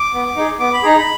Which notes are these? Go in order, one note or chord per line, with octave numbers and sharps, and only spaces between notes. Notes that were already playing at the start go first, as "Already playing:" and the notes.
Already playing: D6
B3
D#4 G#4
B3 D6
B5
D#4 G#4 A#5
B5